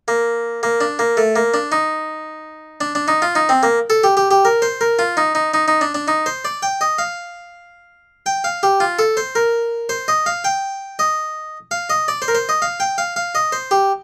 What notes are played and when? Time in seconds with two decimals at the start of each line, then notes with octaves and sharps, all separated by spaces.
0.08 A#3
0.63 A#3
0.81 D4
0.99 A#3
1.17 A3
1.36 A#3
1.54 D4
1.72 D#4
2.81 D4
2.95 D4
3.08 D#4
3.22 F4
3.35 D#4
3.49 C4
3.63 A#3
3.90 A4
4.04 G4
4.17 G4
4.31 G4
4.45 A#4
4.62 C5
4.81 A#4
4.99 F4
5.17 D#4
5.35 D#4
5.54 D#4
5.68 D#4
5.81 D4
5.95 D4
6.08 D#4
6.26 C5
6.45 D5
6.63 G5
6.81 D#5
6.98 F5
8.26 G5
8.44 F5
8.63 G4
8.80 F4
8.99 A4
9.17 C5
9.35 A#4
9.89 C5
10.08 D#5
10.26 F5
10.44 G5
10.99 D#5
11.71 F5
11.90 D#5
12.08 D5
12.22 C5
12.28 A#4
12.35 C5
12.49 D#5
12.62 F5
12.80 G5
12.98 F5
13.16 F5
13.35 D#5
13.52 C5
13.71 G4